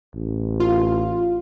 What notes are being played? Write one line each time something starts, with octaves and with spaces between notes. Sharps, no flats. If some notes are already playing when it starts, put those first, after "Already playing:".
A1
F4